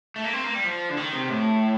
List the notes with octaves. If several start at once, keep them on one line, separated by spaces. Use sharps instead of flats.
A3
A#3
C4
A#3
G3
F3
D3
D#3
C3
A2